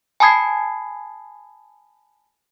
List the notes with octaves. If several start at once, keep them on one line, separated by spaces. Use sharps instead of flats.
G#5 A5 B5 D#6 G#6 C7